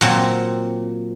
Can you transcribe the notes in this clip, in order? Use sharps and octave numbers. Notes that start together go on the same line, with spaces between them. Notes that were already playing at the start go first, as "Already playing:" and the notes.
A#2 F#3 C4